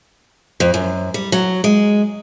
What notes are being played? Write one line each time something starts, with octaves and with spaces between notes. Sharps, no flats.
F2
F#2
G3
F#3
G#3